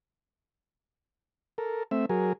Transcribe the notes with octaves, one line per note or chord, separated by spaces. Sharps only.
A4 A#4
A3 C4 E5
F#3 G#4 A#4